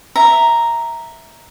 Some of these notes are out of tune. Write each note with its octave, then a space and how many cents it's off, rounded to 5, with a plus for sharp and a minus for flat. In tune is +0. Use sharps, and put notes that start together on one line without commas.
E5 -5 A#5 +0